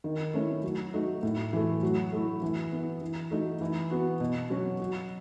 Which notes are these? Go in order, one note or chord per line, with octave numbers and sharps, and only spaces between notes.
D#3
A3 C#4 E4
F#3
A3 D#4 F#4
A2
E3 A3
F#3
A3 E4
E3
B3 E4
E3
A3 D#4 F#4
E3
B3 F#4
B2
F#3 C#4 F#4
F#3